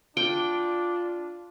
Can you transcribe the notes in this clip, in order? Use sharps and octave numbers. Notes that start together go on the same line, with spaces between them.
D4 F4 G5